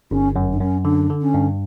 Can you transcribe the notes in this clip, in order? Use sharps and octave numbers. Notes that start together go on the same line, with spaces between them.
G1 C#4
F#2
D4
F#2 C#4
D3 D4
D3
C#4
G2